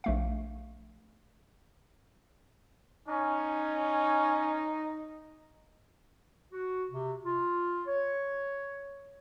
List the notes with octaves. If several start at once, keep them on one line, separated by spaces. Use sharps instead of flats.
A#1 A3 F5
C#4 D#4
F#4
C3
F4
C#5